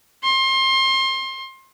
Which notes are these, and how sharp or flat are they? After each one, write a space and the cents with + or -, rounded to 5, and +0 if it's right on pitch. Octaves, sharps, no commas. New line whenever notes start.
C6 +30